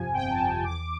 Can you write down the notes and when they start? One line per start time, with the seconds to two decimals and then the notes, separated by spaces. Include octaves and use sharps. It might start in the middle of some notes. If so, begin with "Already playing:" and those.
Already playing: G1 F2 C3 F3 G#5
0.14 G1 G5
0.31 A5
0.38 F2 C3 F3
0.63 E2 D6